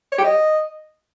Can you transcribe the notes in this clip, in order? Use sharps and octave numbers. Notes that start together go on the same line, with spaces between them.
C#5
G4
D#5